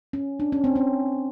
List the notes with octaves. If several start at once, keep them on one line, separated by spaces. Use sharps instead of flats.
C#4
D4
C#4
C4
C#4